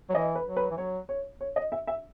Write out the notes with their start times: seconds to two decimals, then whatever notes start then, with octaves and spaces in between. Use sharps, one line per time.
0.09 F#3
0.15 E3 D#5
0.35 B4
0.46 F#3
0.57 B4
0.71 E3
0.77 F#3 C#5
1.09 C#5
1.41 C#5
1.56 D#5
1.72 E5
1.87 E5